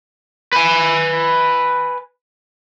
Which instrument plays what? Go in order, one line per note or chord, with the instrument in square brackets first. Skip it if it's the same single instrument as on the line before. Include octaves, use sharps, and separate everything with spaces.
[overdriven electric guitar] B4 G#5